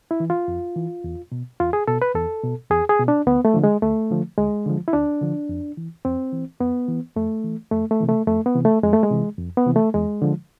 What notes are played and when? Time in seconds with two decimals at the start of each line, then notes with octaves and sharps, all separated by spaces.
0.11 E4
0.20 E3
0.30 F4
0.48 F2
0.76 E3
1.04 E2
1.32 B2
1.60 E2 F4
1.73 G#4
1.87 B2 A4
2.02 B4
2.15 E2 A4
2.43 B2
2.70 E2 G#4
2.89 G#4
2.99 B2
3.08 D4
3.27 D2 B3
3.45 A3
3.54 D3 F3
3.64 G#3
3.82 D2 A3
4.10 D3 F3
4.38 D2 G#3
4.66 D3 F3
4.88 E4
4.93 D2 D4
5.21 D3 F3
5.49 F2
5.77 E3
6.05 F2 C4
6.33 E3
6.60 F2 B3
6.88 E3
7.16 F2 A3
7.44 E3
7.71 F2 A3
7.91 A3
8.00 C3 E3
8.09 A3
8.27 F2 A3
8.46 B3
8.55 C3 E3
8.65 A3
8.83 F2 G#3
8.93 A3
9.03 G#3
9.11 C3 E3
9.38 F2
9.57 B3
9.66 C3 E3
9.76 A3
9.94 E2 G#3
10.22 D3 F3